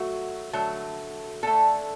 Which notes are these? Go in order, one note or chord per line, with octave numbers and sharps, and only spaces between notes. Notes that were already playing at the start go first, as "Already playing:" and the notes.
Already playing: F#3 A3 F#4
D3 F#3 A3
D3 A3 A4